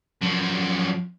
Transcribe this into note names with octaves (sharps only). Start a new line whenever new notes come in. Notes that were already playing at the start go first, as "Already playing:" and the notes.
F#2 F3